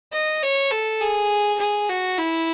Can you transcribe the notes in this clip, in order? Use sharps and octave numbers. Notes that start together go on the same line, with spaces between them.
D#5
C#5
A4
G#4
G#4
F#4
E4